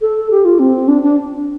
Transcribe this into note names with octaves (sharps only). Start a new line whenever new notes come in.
A4
G4
F4
C4
D4
D4